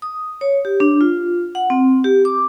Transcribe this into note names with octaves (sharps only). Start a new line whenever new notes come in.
D#6
C#5
G4
D4
F4
F#5
C4
G4
D6